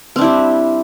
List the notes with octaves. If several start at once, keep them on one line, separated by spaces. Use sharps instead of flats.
G3 C4 D4 E4